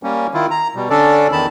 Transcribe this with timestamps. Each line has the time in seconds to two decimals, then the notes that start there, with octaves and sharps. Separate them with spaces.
0.03 G3 A#3 C#4
0.34 D#3 E4 F4
0.51 A#5
0.76 B2 G3
0.90 D3 C#4 D4 A4 D5
1.32 E2 D#3 A5 B5